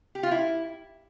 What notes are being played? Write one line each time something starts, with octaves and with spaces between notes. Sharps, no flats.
G4
F4
E4